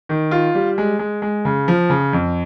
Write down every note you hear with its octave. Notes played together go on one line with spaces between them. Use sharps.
D#3
F4
G3
G#3
G#3
G#3
C#3
F3
C#3
F2